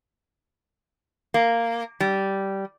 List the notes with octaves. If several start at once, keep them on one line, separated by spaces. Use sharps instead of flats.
A#3
G3